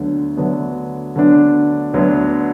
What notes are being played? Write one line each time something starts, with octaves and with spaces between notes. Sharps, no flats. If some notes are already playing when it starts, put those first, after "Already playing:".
Already playing: D2 D3 F#3 B3 D4
D2 D3 F#3 B3 D4
D2 D3 F#3 B3 D4
D2 D3 F#3 B3 D4